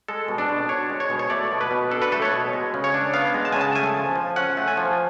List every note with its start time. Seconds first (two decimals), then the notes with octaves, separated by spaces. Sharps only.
0.08 G#3 A4
0.28 B2
0.38 D4
0.49 B2
0.69 D4 C#5
0.90 G#3
1.00 C#5
1.10 B2
1.19 C#5
1.30 A3 D5
1.51 B2
1.61 B4
1.71 B2
1.91 D4 A4
2.02 B4
2.12 A3 A4
2.22 C#5
2.32 B2
2.53 G#3
2.74 C#3
2.84 C#5
2.94 D4
3.14 B3 F5
3.34 G#3
3.45 A5
3.52 C#3 G#5
3.61 A5
3.75 A3 G#5
3.96 F3
4.16 F3
4.36 C#4 F#5
4.57 A3
4.68 G#5
4.77 F3